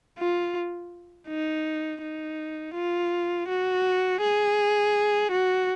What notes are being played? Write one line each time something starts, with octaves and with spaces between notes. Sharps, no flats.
F4
D#4
D#4
F4
F#4
G#4
F#4